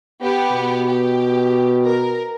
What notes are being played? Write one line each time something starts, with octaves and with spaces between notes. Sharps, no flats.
B3 G4
B2
G4
A#4